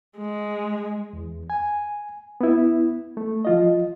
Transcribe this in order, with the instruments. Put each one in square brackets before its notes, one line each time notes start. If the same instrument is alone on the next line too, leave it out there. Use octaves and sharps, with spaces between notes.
[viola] G#3
[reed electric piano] E2
G#5
B3 E4
A3
F3 F4 D#5